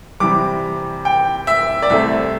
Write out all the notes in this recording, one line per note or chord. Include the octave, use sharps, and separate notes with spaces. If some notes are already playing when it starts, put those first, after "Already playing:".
C3 E3 G3 D6
G5
E5
D5
C2 C3 A3 E5